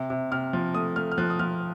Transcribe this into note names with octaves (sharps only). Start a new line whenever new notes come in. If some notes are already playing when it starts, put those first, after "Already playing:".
Already playing: C3
C3
C3 F6
F3
A3 D#6
A3 F6
F6
F3 F#6
D#6
F3 F6